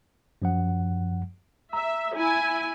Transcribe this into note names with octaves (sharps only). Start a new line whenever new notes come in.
F#2 F3 F#5
E5 A#5
E4 G#5